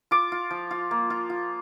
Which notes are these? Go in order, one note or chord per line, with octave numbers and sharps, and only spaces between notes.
F4 D6
F4
F3
F4
A#3
F4
F4